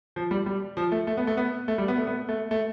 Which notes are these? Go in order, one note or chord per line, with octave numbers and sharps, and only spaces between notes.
F3
G3
G3
F3
A3
A3
B3
A3
B3
A3
G3
B3
A3
B3
A3
A3